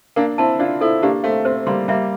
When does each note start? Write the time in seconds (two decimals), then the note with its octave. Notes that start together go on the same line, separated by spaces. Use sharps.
0.16 A#3 D4 A#4
0.38 C4 E4 A5
0.59 D4 F4 D5
0.81 C4 E4 A4
1.02 A#3 D4 G4
1.24 A3 C4 F5
1.45 A3 C4 C5
1.67 G3 A#3 C6
1.88 G3 A#3 E5